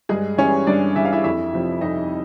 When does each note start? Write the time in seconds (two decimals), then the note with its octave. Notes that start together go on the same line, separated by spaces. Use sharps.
0.09 G2 G#3 G#4
0.38 E3 G3 C#4 C#5
0.67 G2 D4 D5
0.96 E3 G3 E5
1.05 F5
1.13 E4 E5
1.24 F2 E4 E5
1.53 C3 F3
1.81 F2 D#4 D#5